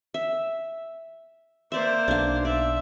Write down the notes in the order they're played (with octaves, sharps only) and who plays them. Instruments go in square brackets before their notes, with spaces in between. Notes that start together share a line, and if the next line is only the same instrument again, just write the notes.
[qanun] E5
[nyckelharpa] A#3 C5 [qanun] D5 E5
[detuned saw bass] B1 [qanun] D4 F5
[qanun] D5 [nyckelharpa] E5